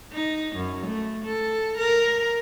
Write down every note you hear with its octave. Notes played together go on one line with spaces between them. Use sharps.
D#4
F#2
A3
A4
A#4